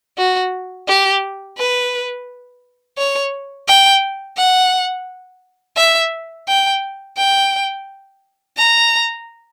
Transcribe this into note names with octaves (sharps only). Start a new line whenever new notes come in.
F#4
G4
B4
C#5
G5
F#5
E5
G5
G5
A#5